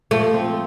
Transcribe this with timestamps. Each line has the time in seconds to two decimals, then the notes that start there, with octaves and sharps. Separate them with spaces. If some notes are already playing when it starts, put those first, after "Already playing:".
0.11 F3 A3
0.34 C4